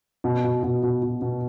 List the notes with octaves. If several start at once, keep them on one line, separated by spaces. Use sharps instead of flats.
B2
B2
B2
B2
B2
B2